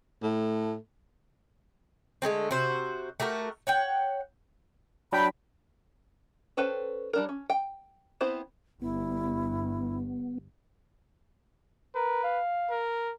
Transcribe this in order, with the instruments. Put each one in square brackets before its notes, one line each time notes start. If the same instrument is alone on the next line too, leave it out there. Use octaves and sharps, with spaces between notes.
[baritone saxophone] A2 [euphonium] A3
[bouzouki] D3 G#3 A3 C4
C3 F#4 C5
A3 F#4 G4 A#4
C#5 F#5 G5
[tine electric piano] F#3 D4 [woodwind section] G5 B5
[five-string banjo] C#4 A4 B4 C5 G5
G3 D4 A#4
C#4
G5
B3 C4 E4 C5
[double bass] G1 G2 [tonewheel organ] B3 [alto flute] E4
[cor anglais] A#4 [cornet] B4
[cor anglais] F5
[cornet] A#4